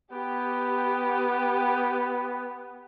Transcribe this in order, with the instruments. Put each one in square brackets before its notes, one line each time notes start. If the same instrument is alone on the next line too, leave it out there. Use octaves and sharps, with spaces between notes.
[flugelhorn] B3 [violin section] G4